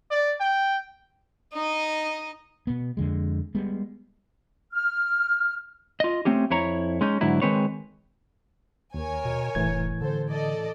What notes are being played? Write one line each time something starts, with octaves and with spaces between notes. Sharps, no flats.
D5
G5
D#4 D#5
B2 B3
F2 D3 G#3
G3 G#3 B3
F6
F4 D#5
A3 C4 C#4 G4
F2 E4 C#5 A#5
G#3 C#4 D#4
G#2 D3 F#3 E4
D#3 G#3 C4 B4 C#5
D#2 A#4 C#5 G#5
B2
F1 A2 E3 G#6
D3 A4 C5
A4 D5 D#5